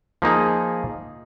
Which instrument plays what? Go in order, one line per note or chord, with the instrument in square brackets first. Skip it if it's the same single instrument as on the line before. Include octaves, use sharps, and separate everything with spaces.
[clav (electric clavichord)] F3 A#3 D#4 G#4